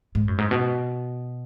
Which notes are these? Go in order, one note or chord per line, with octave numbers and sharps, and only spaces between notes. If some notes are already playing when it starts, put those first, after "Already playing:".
G#2
F#2
G#2
B2